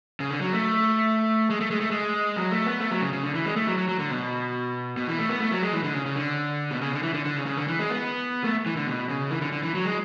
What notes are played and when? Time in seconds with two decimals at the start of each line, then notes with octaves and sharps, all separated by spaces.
0.20 C#3
0.31 D3
0.41 F#3
0.53 A3
1.50 G#3
1.61 A3
1.71 G#3
1.81 A3
1.91 G#3
2.36 F#3
2.52 A3
2.66 B3
2.80 A3
2.91 F#3
3.02 C#3
3.13 C#3
3.23 D3
3.35 E3
3.45 G#3
3.56 A3
3.67 F#3
3.78 F#3
3.89 F#3
3.99 D3
4.11 B2
4.97 B2
5.08 E3
5.19 A3
5.29 B3
5.40 A3
5.51 F#3
5.62 G#3
5.73 E3
5.84 D3
5.94 C#3
6.05 C#3
6.16 D3
6.71 B2
6.81 C#3
6.92 D3
7.03 E3
7.14 D3
7.25 D3
7.36 C#3
7.46 C#3
7.58 D3
7.68 E3
7.79 G#3
7.90 B3
8.44 A3
8.66 E3
8.76 D3
8.87 B2
9.09 C#3
9.31 E3
9.41 D3
9.52 D3
9.63 E3
9.74 F#3
9.85 G#3